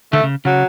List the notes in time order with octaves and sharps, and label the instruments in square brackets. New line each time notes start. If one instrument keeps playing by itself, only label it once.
[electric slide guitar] D3 [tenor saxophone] A3
[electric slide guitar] C#3
[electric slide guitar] C#3 [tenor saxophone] F#3